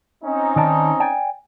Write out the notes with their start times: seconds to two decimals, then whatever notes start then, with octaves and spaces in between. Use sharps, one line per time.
0.24 C4 C#4 D#4
0.56 D#3 D5 A5
1.00 D5 G5 G#5